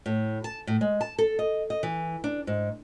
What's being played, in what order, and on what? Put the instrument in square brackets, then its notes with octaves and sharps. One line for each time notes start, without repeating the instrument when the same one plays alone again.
[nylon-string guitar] A2
A5
A2
G#3
A5
A4
D#5
D#5
E3
D4
G#2